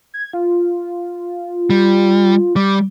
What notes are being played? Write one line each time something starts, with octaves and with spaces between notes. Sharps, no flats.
G#6
F4
G3
G3 D6